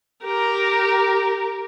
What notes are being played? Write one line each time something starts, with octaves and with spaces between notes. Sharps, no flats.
G4 A#4